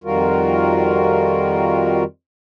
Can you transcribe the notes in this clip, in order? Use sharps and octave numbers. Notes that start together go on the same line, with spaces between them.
F2 D#3 G3 F4 F#4 A#4